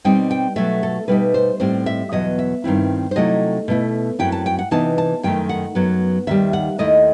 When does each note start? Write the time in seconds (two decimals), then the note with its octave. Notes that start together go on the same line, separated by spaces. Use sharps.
0.04 B2 G3 C4 D#4 G5
0.31 G5
0.56 B2 F#3 A3 E5
0.83 A4
1.08 B2 G3 D#4 B4
1.34 C5
1.60 A2 G3 C4 C5
1.86 E5
2.12 E2 B2 F#3 D#5
2.39 E5
2.64 G2 D#3 F#3 C4 E4
3.11 C5
3.16 C3 F#3 A3 C4 E4 D#5
3.68 B2 A3 E4
4.19 F#2 F#3 C4 E4 G5
4.32 A5
4.46 G5
4.59 F#5
4.71 C3 E3 B3 D#4 A5
4.98 A5
5.23 F#2 D#3 A3 G5
5.49 F#5
5.75 F#2 F#3 B3
6.27 D#2 D#3 G3 E5
6.53 F#5
6.78 D#2 D#3 A3 E4 D#5